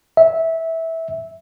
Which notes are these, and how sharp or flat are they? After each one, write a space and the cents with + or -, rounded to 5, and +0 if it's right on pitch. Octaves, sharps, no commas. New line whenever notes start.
E5 -15